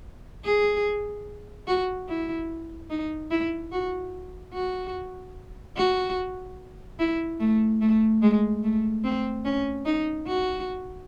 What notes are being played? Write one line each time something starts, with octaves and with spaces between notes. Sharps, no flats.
G#4
F#4
E4
D#4
E4
F#4
F#4
F#4
E4
A3
A3
G#3
A3
C4
C#4
D#4
F#4